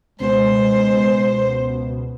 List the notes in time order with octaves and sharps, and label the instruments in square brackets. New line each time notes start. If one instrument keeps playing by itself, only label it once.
[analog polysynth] C#2 B2 [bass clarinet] G#3 [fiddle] C5